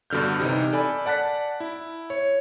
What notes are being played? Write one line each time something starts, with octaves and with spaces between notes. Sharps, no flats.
G2 B2 D3 F6 G6
C3 E3 D#4
A4 D5 G#5 B5
D5 F#5 A5 F#6 B6
E4
C#5